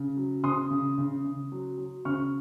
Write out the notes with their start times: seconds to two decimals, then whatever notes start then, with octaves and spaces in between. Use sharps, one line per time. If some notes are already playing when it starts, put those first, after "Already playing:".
Already playing: C#3
0.17 F#3
0.44 C#3 C6 D#6
0.71 C#3
0.98 C#3
1.25 C#3
1.52 F#3
1.78 F#3
2.05 C#3 C#6 F6